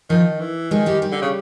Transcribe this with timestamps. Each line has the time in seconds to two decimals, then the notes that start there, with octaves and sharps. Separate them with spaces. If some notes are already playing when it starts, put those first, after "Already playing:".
0.10 D#3 F3 F4
0.40 E3
0.71 D#3 G#3 G#4
0.86 G3 G4
1.02 G3 G4
1.12 D3
1.22 C#3